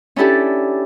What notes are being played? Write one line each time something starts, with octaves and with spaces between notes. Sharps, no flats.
C#4 D4 E4 G4 A4